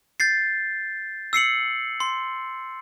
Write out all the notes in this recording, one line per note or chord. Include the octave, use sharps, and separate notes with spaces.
G6 A6 C7
E6 C7 C#7 F#7
C6